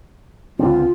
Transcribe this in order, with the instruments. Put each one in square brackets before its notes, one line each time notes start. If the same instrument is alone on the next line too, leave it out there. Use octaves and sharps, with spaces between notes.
[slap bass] C#2 D3 C4 [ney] F4